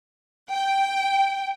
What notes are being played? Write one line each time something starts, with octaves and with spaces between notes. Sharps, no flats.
G5